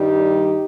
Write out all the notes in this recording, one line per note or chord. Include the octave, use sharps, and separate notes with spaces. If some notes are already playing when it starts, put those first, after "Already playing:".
Already playing: G2 D#3 G3 D#4 G4